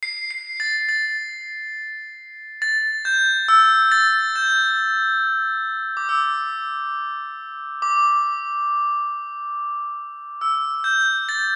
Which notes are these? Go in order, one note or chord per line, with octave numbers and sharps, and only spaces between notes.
C7
C7
A6
A6
A6
G6
E6
A6
G6
D6
E6
D6
E6
G6
A6